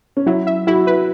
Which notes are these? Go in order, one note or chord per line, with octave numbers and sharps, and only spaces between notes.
C#4
F#3 E4
E5
E4 F#4
B4